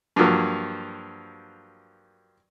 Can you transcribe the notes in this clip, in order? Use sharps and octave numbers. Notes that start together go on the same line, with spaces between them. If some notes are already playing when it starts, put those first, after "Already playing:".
G2 F3 F#3 A#3